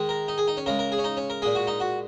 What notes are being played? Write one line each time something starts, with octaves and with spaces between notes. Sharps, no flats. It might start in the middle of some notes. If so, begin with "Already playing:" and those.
Already playing: D#3 G#3
A#4
D#4
G#4
D#4
C#4
C#3 G#3 A#4
A#4
G#4
C#4
D#4
C#4
A#4
A#2 G#3 G#4
F#4
D#4
F#4